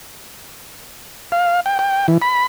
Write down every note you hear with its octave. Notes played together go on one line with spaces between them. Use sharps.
F5
G5
G5
E3
B5